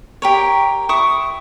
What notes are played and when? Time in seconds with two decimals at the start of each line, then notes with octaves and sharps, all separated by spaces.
0.22 G4 A#4 C#5
0.89 E4 C#6 D#6